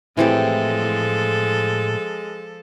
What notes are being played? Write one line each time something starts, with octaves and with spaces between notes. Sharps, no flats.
A2 E3 F3 G#3 C4 G4 A4